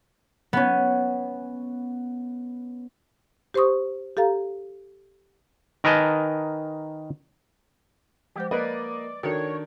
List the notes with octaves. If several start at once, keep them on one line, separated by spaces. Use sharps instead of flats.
B3 C#4
G4 C5 C6 C#6 D#6
G4 A4 F5 A#5
D#3 A#4 B4 D#5 G#5 A5
F3 G#3 G4 C5
A#3 B4 D5 D#5
D#3 D4 F#4 A4 C#5